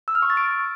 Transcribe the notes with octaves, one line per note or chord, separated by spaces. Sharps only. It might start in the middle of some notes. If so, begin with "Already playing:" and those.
E6
F6
C#6
A6
D7